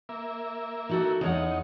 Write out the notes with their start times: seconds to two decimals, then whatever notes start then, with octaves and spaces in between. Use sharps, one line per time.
0.09 A#3 E5
0.89 D#4 F#4 A4
1.21 E2 D#4 C#5 F#5